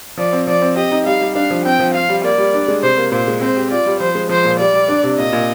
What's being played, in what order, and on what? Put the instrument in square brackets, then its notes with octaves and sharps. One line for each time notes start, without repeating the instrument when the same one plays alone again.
[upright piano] F3 [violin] D5
[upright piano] C4
[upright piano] F3 [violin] D5
[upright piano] C4
[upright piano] G4 [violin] D#5
[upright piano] D#4
[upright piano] G3 [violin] F5
[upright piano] G3
[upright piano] D4 [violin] F5
[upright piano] F3
[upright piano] C4 [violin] G5
[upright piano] F3
[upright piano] F4 [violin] F5
[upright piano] G3
[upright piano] A#3 [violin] D5
[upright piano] G3
D4
G#3
[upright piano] C3 [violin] C5
[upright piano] A#3
[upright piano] A#2 [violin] C5
[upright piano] G#3
[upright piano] C4 [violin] C5
[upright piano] G4
[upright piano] F4 [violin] D5
[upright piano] G3
[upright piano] F3 [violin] C5
[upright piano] G#3
[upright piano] F3 [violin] C5
[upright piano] A#2
[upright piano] G3 [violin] D5
[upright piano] G3
D4
C3
[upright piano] A#2 [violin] D#5
[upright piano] A#2